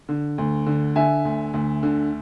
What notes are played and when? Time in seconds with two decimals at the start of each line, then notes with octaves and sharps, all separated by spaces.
0.09 D3
0.38 D2
0.66 D3
0.96 D3 E5 G#5
1.25 D2
1.54 D2
1.83 D3